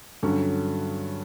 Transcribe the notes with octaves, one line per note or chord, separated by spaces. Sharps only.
G2 D3 F#3 C#4